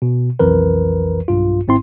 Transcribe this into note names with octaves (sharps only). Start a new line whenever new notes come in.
B2
B1 F2 E3 A#4 B4
B1 G2 F4
G#1 G#2 C4 E4 C6